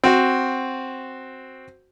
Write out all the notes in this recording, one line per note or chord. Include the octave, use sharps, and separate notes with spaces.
C4 F#4